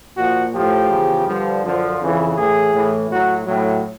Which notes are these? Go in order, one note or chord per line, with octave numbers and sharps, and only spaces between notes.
A#2 F3 F#4
A2 F3 G4
E2 C#3 F3
G2 D3 F3
F#2 D3 F3
F2 C#3 E3
A2 E3 G#4
A2 E3
A2 F#3 F#4
A2 F#3